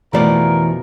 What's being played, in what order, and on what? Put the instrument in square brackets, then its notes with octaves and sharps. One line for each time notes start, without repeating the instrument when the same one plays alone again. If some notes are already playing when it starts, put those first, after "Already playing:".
[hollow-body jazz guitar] F2 B2 F3 [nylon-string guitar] E3 A3 D5 [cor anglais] A#4